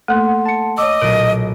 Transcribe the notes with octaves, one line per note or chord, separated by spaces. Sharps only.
A3 A#3 A4 F#5 C6
A5 C#7
C#5 D#5 D6 E6
B1 A#2 A#4 D7